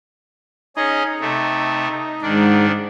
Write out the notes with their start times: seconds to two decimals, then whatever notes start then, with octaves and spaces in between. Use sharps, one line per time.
0.77 C#4 D#4 G#4 D#5
1.21 C3 A3
2.22 G#2 D#3 D4